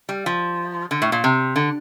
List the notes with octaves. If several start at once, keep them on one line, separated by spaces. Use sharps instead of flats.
G3
F3
D3
A2
A#2
C3
D3